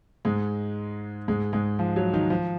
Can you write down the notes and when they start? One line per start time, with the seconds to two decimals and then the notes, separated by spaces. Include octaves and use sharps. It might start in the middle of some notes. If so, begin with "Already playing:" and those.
0.25 G#2 G#3
1.28 G#2 G#3
1.53 G#2 G#3
1.79 F3
1.96 F#3
2.13 D#3 D#4
2.30 F3